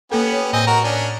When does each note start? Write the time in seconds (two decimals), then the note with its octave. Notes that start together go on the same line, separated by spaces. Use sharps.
0.12 A#3 B3 C#4 G4 A4
0.32 C#5
0.53 A2 C4 D#5 G#5
0.67 F#4 A#4
0.84 C#4 D4